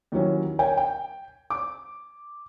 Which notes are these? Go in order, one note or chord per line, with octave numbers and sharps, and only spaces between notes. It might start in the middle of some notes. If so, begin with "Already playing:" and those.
D#2 D#3 E3 F#3 C#4
A#4 C#5 G5 G#5
G5
D6